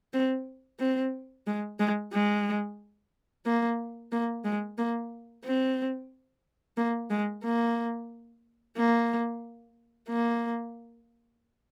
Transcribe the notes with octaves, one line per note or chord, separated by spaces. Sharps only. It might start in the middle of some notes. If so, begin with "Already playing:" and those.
C4
C4
G#3
G#3
G#3
A#3
A#3
G#3
A#3
C4
A#3
G#3
A#3
A#3
A#3